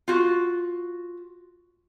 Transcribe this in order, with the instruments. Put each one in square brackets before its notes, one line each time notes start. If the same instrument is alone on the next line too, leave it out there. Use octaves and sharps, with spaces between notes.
[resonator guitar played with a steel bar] F4 F#4